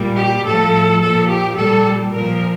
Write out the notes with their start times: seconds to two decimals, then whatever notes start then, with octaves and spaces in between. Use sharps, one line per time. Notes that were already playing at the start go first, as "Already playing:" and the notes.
Already playing: A#2 G3
0.17 G4
0.44 A2 F3 A4
1.01 A#2 F3 A4
1.29 G4
1.57 A#2 G3 A4
2.13 A#2 F3 A#4